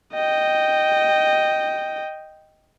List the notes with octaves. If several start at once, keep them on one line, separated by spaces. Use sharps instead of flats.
D#5 G5